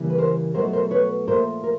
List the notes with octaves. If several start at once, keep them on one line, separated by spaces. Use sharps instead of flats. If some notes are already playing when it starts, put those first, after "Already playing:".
Already playing: C#3 E3 G3 A#3
B4
A#4 C5
B2 F#3 A3 A#4 C5
A#4 C5
B4 C#5
A#2 F3 A3 A#4 C5
A#4